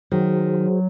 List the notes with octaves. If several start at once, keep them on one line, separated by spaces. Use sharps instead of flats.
D#3 F#3 F#4 G#4 C5